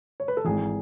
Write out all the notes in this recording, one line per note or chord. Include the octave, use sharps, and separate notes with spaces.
C#5
B4
A4
G#1 G#2 E3 G#4